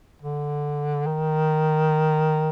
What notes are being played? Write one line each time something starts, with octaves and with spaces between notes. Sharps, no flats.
D3
D#3